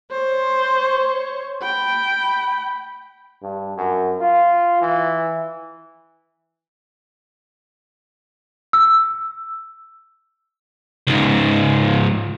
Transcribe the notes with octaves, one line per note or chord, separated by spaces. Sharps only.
C5 C#5
G5 B5
G2
F#2
F4
E3
E6
C#2 G#2